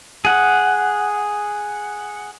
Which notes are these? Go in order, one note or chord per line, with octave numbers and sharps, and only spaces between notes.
G#4 F#5